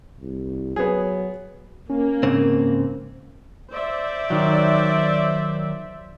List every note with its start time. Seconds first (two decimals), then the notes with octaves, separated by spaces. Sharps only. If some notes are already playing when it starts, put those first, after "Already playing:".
0.20 C2
0.76 F#3 B3 G#4
1.90 A#3 C#4
2.23 G#2 C#3 C4
3.71 C5 D5 E5
4.30 D#3 F#3